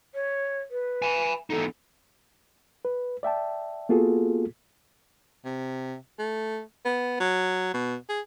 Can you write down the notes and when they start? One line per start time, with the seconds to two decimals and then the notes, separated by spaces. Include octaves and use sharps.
0.14 C#5
0.71 B4
1.02 G#5 B5
1.50 E2 D#4 A4
2.85 B4
3.23 D5 E5 G5 A5
3.89 A#3 B3 F4 F#4 G#4 A4
5.45 C3
6.19 A3
6.85 B3
7.20 F#3
7.74 B2
8.09 G#4